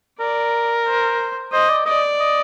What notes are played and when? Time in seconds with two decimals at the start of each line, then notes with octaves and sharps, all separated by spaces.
0.19 A#4 D5
0.86 C5
1.52 C5 D#5
1.69 D5
1.86 D5 D#5
2.20 D#5